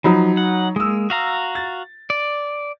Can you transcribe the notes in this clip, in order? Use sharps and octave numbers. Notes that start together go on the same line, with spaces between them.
F3 F#3 D#4 B5
F#5
G#3 A#3 D#6 E6
F#4 F5 A#5
A6
D5